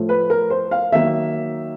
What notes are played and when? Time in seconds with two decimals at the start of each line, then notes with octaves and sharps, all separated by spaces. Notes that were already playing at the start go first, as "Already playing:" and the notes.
Already playing: A2 F3 A3
0.09 B4
0.30 A#4
0.50 C5
0.71 F5
0.92 D#3 F#3 A#3 D#4 E5